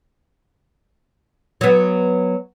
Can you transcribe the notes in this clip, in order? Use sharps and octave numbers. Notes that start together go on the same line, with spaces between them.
F#3 B3